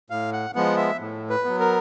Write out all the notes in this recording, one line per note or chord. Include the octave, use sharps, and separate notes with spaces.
A2 F5
F#5
F3 G#3 B3 F#5
E5
A2
B4
F#3 B3
A#4